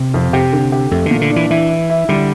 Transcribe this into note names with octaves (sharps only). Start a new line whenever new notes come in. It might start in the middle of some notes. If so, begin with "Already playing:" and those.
Already playing: C3
F2
C3 G4
D3
G4
F2 A3
D3
A#2
D3
D4
E3
E3 E4
E4
E4
D3 G3